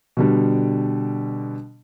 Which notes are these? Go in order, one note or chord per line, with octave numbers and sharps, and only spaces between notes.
B2 D3 G3